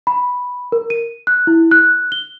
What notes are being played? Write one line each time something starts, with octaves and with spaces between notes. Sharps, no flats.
B5
A#4
D#7
F#6
E4
F#6
G7